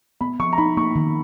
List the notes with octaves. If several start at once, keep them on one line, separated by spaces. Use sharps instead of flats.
B3 B5
F3 C#6
A#5
D#4 B5
A#3 C#6
D#3